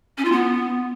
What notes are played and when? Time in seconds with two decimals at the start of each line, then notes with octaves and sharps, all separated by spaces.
0.18 C#4
0.25 F4
0.32 B3